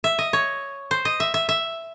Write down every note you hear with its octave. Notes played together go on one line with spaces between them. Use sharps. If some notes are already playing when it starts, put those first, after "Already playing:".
E5
D#5
C#5
C5
D#5
E5
E5
E5